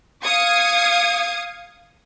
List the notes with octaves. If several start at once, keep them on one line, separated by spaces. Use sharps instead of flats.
F5 D#6 G#6 C#7